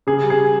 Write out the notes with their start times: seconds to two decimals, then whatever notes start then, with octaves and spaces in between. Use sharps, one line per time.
0.07 C#3 G#4
0.23 G3
0.30 G#4